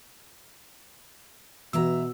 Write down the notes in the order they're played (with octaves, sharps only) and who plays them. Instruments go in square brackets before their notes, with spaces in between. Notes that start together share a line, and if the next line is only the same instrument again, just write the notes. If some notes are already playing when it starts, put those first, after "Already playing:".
[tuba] B2 [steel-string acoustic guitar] E3 E5 A#5 [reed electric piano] F#4 E6